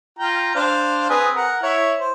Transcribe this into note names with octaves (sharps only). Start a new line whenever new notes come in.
F4 G5 A#5
D4 C5 F5
C4 G#4 B4
A#4 F#5
E4 C#5
C5